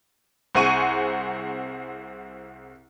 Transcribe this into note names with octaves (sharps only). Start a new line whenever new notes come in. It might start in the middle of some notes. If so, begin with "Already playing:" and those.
C2 C4 G#4 F#5 C#6 D#7